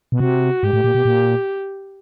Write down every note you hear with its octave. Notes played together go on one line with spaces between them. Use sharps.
B2
C3 F#4
G#2 G4
A2
A#2
B2
A#2